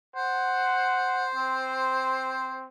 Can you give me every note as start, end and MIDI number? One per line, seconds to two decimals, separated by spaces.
0.16 2.64 72
0.16 1.28 78
1.35 2.67 60